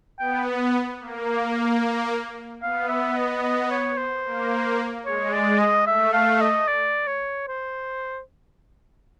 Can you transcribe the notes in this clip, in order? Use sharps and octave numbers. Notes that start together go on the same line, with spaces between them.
B3 G5
A#3
B3 F5
E5
D#5
D#5
C#5
C5
A#3
G#3 C#5
D5
D#5
A3 E5
F5
D#5
D5
C#5
C5